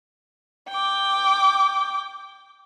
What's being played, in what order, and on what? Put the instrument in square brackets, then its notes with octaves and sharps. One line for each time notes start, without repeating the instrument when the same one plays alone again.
[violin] G5 D6